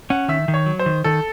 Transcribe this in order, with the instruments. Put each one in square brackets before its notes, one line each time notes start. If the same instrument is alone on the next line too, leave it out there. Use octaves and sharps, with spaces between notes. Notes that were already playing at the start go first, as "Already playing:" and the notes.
[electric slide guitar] C#4 [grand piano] F#5
[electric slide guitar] D#3 [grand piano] E5
[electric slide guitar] D#3
[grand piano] C#5
[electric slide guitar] F#3
[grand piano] C5
[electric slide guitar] D#3
[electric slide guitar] D#3 [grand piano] A4